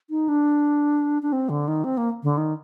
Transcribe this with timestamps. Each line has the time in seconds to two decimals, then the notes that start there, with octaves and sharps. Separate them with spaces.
0.10 D#4
0.28 D4
1.22 D4
1.32 C4
1.49 D3
1.68 D#3
1.84 C4
1.97 A#3
2.23 D3
2.37 D#3